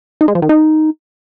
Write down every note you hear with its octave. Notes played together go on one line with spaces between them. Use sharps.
D#4
G#3
F3
D#3
D#4